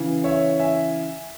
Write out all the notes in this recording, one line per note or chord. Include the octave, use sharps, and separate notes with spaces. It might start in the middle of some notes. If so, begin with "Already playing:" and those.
Already playing: C#3 E3
C#5 E5
E5 G#5